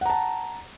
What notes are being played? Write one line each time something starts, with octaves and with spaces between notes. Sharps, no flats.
F#5 A5 A#5